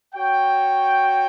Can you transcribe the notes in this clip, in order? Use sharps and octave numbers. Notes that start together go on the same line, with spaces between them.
F#4 C#5 G5